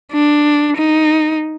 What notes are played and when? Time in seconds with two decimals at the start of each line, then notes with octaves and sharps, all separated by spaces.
0.12 D4
0.76 D#4